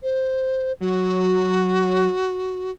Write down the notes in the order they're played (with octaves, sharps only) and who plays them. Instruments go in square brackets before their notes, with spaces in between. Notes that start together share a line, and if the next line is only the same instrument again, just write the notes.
[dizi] C5
[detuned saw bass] F#3 [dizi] F#4